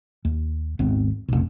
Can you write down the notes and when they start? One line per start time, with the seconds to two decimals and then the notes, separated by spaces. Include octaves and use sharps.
0.25 D#2
0.79 G#1 D#2 B3 C4
1.28 F1 B1